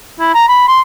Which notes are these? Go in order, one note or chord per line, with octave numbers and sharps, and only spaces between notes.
E4
A#5
B5
C6